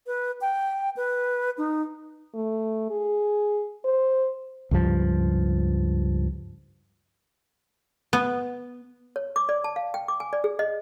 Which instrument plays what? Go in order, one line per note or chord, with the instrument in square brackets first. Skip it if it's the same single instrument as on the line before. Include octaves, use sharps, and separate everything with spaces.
[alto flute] B4
G5
B4
D#4
[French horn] A3
G#4
C5
[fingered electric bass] C#2 G2 F3
[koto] B3
[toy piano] C#5
D6
D5
A5
F5
G5
D6
G#5
D5
G#4
D#5